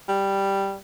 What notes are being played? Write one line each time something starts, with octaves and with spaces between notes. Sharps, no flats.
G3